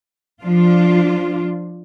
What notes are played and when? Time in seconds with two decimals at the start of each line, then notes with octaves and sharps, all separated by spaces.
0.42 F3 D4 F4